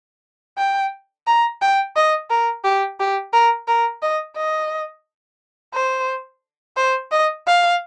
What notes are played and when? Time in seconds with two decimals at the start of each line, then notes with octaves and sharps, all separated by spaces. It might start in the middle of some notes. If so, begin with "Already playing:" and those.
0.58 G5
1.27 A#5
1.61 G5
1.96 D#5
2.30 A#4
2.65 G4
3.00 G4
3.33 A#4
3.68 A#4
4.02 D#5
4.36 D#5
5.74 C5
6.77 C5
7.12 D#5
7.47 F5